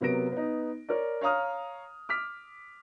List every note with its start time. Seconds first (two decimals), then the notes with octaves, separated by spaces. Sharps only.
0.01 C3 F#3 B3 A#4 A#6 D7
0.32 B3 D#4
0.88 A#4 C#5 D5
1.21 C#5 F5 A#5 D#6 F6
2.09 D6 F6 B6